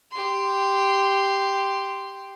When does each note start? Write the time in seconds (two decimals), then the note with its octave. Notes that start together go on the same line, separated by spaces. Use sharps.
0.11 G4 C6